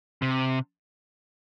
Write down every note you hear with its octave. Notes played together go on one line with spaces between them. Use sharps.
C3